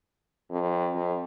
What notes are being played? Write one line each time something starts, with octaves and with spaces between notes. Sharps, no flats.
F2
F2